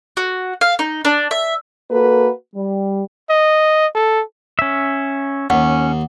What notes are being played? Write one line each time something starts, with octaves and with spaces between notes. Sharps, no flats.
F#4
F5
D#4
D4
E5
A#3 F#4 A4 B4
G3
D#5
A4
C#4 E5
D#2 C#4 F#5